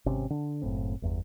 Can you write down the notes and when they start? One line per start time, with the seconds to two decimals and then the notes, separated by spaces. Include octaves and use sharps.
0.06 G#1 C3 C#4
0.30 D3
0.62 F#1 A2 C4
1.02 G1 E2